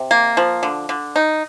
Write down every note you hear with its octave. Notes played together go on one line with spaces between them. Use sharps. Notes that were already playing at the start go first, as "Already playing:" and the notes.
Already playing: C3
A#3
F3
D3
D3
D#4